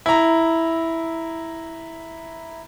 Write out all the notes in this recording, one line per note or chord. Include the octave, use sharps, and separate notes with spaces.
E4 A#5